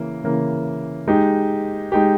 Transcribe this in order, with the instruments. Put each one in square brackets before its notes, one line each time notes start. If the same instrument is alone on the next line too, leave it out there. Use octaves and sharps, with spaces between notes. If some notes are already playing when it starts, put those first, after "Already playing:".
Already playing: [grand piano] C#3 E3 A#3
C#3 E3 A#3
G#3 D#4 G4
G#3 D#4 G4